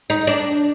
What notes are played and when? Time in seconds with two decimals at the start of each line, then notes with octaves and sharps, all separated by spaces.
0.10 D#4
0.27 D4